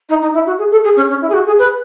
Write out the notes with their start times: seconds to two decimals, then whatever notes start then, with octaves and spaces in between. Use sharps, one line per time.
0.09 D#4
0.21 D#4
0.33 E4
0.46 F#4
0.58 G#4
0.71 A4
0.84 G#4
0.96 C#4
1.09 C#4
1.21 E4
1.29 G#4
1.33 F#4
1.46 G#4
1.58 B4